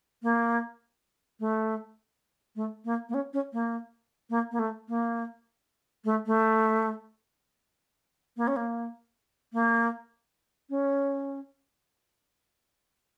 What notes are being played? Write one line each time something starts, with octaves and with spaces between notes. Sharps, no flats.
A#3
A3
A3
A#3
A#3
C#4
C#4
A#3
A#3
A#3
A3
A#3
A3
A3
A#3
C#4
A#3
A#3
C#4